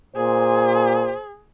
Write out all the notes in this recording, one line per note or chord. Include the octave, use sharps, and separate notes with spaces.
A#2 G#4 C5